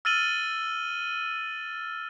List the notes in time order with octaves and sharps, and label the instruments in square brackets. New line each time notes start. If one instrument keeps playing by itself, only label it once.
[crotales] E6 F6 A6 D#7 F#7 G7